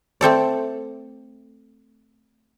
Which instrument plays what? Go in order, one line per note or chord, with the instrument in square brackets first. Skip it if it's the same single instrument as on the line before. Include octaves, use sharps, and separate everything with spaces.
[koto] A3 C4 A4 D5